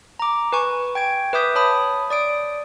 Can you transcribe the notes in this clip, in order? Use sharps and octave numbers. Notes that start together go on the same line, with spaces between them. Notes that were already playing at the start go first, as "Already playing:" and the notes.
A#5 D6
B4 G#5 C#6
G5 G#6 D7
B4 E5 D6 D#6 G6 B6
C#5 A5 B5 D#6
D5 D#6 D7